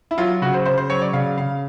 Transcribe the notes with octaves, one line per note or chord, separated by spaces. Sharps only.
E4
F#3 F4
C#3 F#4
C5
C#3 C5
C5
F#3 C#5
D5
C#3 F5
C#3 F5